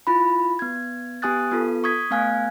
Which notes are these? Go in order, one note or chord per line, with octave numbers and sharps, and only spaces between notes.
E4 F4 B5
B3 G#6
B3 G4 G#5 D#6 F#6 A6
B3 F4 A4
C#6 D#6 G#6 B6
A3 B3 F5 G#5 F#6 G#6